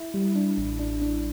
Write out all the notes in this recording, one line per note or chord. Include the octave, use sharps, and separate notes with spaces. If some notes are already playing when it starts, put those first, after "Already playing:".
Already playing: E4
G3
D4
A1
D4
D4